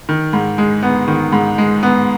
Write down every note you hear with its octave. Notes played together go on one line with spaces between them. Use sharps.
D#3
G#2
G#3
B3
D#3
G#2
G#3
B3